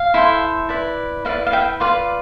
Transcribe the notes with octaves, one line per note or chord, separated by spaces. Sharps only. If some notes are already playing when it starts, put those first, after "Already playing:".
Already playing: F5
E4 A4 C5
E4 B4 D5
E4 B4 D5 F5
F5
E5 G5
F4 B4 D5 F5